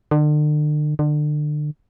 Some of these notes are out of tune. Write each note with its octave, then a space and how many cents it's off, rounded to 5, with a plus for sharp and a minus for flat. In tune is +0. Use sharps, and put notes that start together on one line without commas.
D3 +40
D3 +30